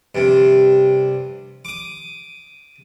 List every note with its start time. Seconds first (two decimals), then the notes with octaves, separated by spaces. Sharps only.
0.15 G2 C3
1.65 D6 D#6